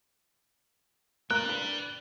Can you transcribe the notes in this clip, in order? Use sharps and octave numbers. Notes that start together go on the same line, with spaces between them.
A#3 A#4 D5 G5 F#6
D4 B4